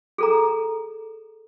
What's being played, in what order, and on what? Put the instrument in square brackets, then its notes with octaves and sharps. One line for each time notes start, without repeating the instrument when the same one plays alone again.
[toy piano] G#4 A4 A#5